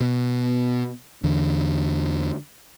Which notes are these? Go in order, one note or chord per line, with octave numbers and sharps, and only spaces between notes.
B2
E2 D3